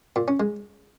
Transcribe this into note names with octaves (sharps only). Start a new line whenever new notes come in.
A#2
C#4
G#3